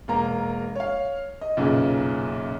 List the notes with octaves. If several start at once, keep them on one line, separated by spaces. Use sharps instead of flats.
E1 A#3 A#5
C#5 F5
D#5
B1 F#2 A#2 C#3